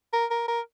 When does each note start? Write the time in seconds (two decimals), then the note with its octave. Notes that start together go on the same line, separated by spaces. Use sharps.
0.13 A#4
0.31 A#4
0.48 A#4